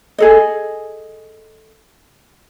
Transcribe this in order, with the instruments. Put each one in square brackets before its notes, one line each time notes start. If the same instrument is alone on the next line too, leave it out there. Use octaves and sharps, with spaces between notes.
[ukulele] G#4 A4 D#5